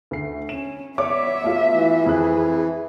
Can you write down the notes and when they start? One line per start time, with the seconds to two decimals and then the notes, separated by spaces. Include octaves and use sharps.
0.11 D2 C7
0.49 C#4 E7
0.98 B3 C#5 D5 E5 D6
1.44 A3 F4 F#4
1.74 E3
2.06 F2 G#4 F#6